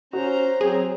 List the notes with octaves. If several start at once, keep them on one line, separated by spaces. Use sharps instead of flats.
C#4 F#4 C5 A#5
F#3 C4 G#4